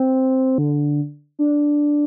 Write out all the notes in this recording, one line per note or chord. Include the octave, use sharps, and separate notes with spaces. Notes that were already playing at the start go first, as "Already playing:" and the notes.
Already playing: C4
D3
D4